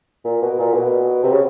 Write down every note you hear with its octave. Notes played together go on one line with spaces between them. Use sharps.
A#2
B2
A#2
B2
C3
C#3